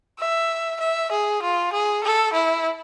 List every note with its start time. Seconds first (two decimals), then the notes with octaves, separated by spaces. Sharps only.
0.20 E5
0.80 E5
1.12 G#4
1.42 F4
1.73 G#4
2.04 A4
2.33 E4